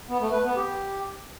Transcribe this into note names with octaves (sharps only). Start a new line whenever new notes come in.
B3
A3
B4
B3
G4